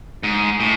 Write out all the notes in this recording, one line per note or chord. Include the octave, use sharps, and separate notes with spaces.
G#2
A2